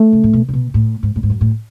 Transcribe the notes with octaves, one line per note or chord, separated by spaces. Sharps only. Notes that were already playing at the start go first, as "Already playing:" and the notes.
Already playing: A3
C#3
A2
B2
C#3
B2
A2
G#2
A2
G#2
F#2
A2